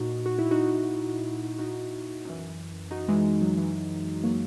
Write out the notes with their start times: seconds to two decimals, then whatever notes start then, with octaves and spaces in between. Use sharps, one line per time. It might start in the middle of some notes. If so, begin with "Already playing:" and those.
Already playing: A#2 D#4 F#4
0.26 F#4
0.39 E4
0.51 D#4 F#4
1.58 D#4 F#4
2.25 F#2 E3
2.91 D#4 F#4
3.08 E3 G#3
3.25 E3
3.42 F#3
3.57 E3 G#3
4.24 F#3 A#3